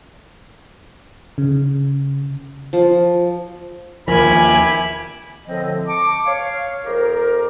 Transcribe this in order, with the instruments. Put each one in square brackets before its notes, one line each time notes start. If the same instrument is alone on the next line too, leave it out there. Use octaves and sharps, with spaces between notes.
[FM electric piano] C#3
[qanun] F3
[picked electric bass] D#2 F3 [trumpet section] E4 G4 B5 [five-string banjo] A#4 [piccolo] G#5
[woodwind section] A2 D3 F3 C4 D#5
A5 C#6 D6
C#5 F5
F2 G4 A#4